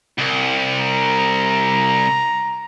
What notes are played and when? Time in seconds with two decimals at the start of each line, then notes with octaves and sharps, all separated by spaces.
0.19 C2
0.79 A#5